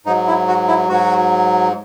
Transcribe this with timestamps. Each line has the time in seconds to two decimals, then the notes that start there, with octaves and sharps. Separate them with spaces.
0.06 G#2 F#3 D#4
0.27 E4
0.48 F#4
0.68 E4
0.89 G#2 F#3 F#4